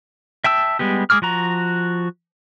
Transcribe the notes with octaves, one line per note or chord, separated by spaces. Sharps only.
E5 G5 A5 E6
G3 G#3 B3 G4
G#3 A3 G#4 D6 F6
F3 F#4 A#5